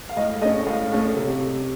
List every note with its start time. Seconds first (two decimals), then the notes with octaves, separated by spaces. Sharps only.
0.09 F5
0.17 A2 D#5
0.41 A3 D#5
0.45 C#4
0.67 A2 F5
0.92 A3 C#4
1.17 C3